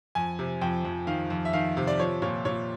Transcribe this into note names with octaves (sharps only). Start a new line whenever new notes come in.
F2 G#5
C3
F2 G5
F2
D#3 F5
F2
E5
D#3 F5
C3
D5
F3 C#5
A#2 C#5
A#2 C#5